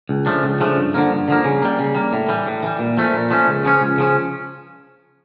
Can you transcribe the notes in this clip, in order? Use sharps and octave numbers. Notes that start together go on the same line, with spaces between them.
C#2
C#3 F3 A3 D4
C#2
C#3 F3 A3 D4
G2
D3 F3 A#3
G2
D3 F3 A#3
C#3
G3 A#3
C#3
G3 A#3
A2
E3 G3
A2
E3 G3
A#2
F3 A3 C#4
A#2
F3 A3 C#4
C#2
C#3 F3 C#4
C#2
C#3 F3 C#4